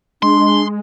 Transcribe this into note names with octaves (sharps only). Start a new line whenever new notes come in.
G#3 D4 C6